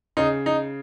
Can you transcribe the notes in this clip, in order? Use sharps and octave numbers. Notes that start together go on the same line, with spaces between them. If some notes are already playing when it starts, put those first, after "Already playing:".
C#3 D#4
D#4